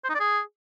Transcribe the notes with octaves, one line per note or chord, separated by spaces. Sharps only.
C5
D#4
D5
G#4